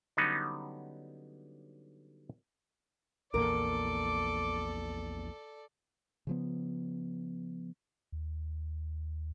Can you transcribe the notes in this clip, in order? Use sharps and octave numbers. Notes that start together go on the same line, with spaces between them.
D3 F#3 G3 B3 C#4 D#4
A#1 E2 A#3 A4 A#4 D5 D6
C#3 F3 B3
D#2